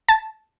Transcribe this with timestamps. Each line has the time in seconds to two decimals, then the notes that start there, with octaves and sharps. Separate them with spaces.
0.08 A5